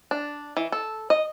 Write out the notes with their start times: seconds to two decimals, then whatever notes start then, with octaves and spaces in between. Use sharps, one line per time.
0.11 D4
0.57 E3
0.72 A4
1.10 D#5